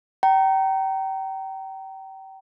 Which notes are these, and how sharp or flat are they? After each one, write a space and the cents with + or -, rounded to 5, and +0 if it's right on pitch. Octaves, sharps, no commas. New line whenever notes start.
G5 -30 A#5 -10